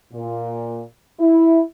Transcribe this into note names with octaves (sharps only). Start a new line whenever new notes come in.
A#2
E4